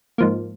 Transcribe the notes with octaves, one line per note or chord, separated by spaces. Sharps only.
G#2 F3 A#3